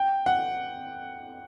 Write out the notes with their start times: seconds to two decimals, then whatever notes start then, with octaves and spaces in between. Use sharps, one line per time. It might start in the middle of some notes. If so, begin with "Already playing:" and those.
Already playing: G5
0.26 F#5